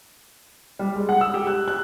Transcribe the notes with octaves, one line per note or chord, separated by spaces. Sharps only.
G3
G#3
F#5
E6
G4
F#6
F#6